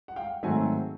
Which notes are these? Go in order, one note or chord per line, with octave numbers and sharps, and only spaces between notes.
F#5
F5 G5
G#2 D#3 F#3 A3 C4 F#5 G#5